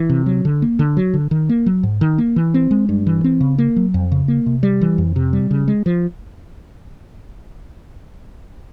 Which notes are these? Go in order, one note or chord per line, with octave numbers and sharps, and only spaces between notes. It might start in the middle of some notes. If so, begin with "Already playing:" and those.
Already playing: E3
C3
F#3
D3
A#3
D3
F#3
D3
D#3
A#3
F#3
G#2
D#3
A#3
E3
C4
G#3
G2
E3
C4
C#3
A#3
F#3
F2
C#3
A#3
C3
G3
E3
F2
C3
G3
C#3
G#3
F3